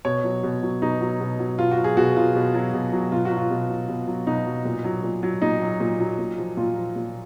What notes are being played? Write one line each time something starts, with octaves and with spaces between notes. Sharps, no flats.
B2 C#5
F#3
B2
F#3
B2 D#4
F#3
B2
F#3
B2 F4
F#4
F#3
G#4
B2 F#4
F#3 F4
B2
F#3
B2
F#3
B2 F4
F#4
F#3
F4
B2
F#3
B2
F#3
B2 D#4
F#3
A#2
F#3
A#2
F#3
A#2 D#4
F#3
A#2
F#3
A#2
F3
A#2 F4
F3
A#2